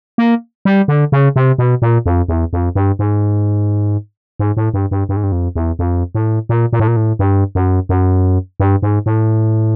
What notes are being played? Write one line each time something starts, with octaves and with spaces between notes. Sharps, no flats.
A#3
G3
D3
C#3
C3
B2
A#2
F2
E2
F2
G2
G#2
G#2
A2
G2
G2
G2
G#2
G2
F2
E2
F2
A2
A#2
A#2
A2
A#2
A2
G2
F#2
F#2
G2
G#2
A2